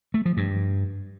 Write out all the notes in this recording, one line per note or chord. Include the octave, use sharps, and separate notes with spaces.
A3
F3
G2